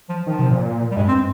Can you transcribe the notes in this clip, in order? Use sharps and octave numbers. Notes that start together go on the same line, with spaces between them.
F3
D#3 F3
C3
A#2
G3
G2 G#3
C4